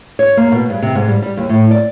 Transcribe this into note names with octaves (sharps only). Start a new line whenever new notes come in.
C#5
A#3
B2
G2
C3
G#2
G3
G3
D#2
A2
D5